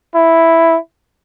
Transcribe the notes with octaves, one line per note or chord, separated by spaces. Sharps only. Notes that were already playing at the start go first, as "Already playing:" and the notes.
E4